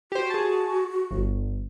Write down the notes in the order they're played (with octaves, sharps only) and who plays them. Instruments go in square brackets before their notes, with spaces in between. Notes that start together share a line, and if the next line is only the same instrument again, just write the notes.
[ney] F#4 [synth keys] G4 C5
[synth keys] G#4 A5
G1